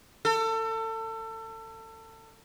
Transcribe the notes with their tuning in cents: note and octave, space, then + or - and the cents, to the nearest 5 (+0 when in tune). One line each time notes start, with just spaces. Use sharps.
A4 +30